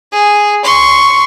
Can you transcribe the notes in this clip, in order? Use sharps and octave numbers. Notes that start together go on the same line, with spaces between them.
G#4
C6 C#6